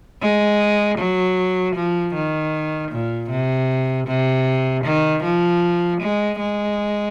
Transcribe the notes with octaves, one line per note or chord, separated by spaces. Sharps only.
G#3
F#3
F3
D#3
A#2
C3
C3
D#3
F3
G#3
G#3